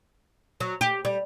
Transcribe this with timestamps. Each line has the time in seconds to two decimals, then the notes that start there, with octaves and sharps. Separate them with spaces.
0.60 F#3
0.81 G4
1.05 G3